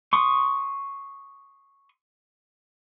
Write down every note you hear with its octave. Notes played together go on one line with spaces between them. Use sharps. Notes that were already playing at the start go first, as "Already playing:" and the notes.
C6 C#6 D#6